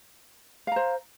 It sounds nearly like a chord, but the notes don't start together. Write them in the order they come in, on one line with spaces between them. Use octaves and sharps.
F5 A#5 C5